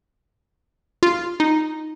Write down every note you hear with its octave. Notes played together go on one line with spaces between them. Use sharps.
F4
D#4